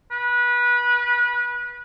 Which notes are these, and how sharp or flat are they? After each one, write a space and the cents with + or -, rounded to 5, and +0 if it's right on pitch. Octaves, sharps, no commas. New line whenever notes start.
B4 -25